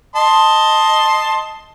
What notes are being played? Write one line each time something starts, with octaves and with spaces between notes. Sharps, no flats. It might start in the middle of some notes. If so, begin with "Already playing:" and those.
D#5 A5 C6